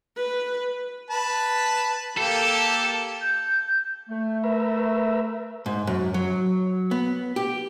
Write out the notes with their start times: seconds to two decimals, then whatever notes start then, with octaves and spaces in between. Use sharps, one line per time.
0.16 B4
1.10 B4 A5 B5
2.17 A#3 G4 A4
3.22 G6
4.09 A3
4.44 A#4 B4 E5
5.66 G#2
5.87 F#2
6.14 F#3
6.91 B3
7.36 G4